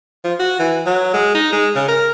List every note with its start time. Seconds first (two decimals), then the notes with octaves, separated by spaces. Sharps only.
0.24 F3
0.39 F#4
0.59 E3
0.86 F#3
1.14 G#3
1.35 D#4
1.52 G#3
1.75 C#3
1.88 A#4